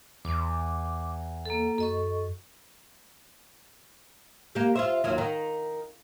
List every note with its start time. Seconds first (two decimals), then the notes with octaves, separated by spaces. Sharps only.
0.25 E2 D6
1.45 A#3 A4
1.78 F#2 A4 D#5 C#6
4.55 A#3 G4
4.76 F4 C5 E5
5.04 D#2 F#3 F4
5.18 D#3